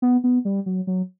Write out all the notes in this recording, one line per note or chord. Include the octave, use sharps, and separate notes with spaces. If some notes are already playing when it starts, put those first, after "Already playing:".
B3
B3
G3
F#3
F#3